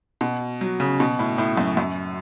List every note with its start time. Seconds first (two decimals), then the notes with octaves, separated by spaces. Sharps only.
0.21 B2
0.61 F#3
0.80 C#3
1.00 B2
1.19 A2
1.38 A2
1.57 F#2
1.77 F#2